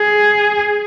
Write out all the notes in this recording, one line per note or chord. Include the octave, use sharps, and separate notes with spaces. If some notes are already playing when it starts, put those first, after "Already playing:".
Already playing: G#4